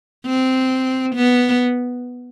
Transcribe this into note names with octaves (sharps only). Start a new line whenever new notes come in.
C4
B3